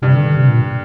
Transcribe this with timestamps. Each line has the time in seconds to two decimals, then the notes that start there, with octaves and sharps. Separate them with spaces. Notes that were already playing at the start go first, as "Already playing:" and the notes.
0.02 G2 C3
0.14 D3
0.25 D3
0.36 C3
0.48 A#2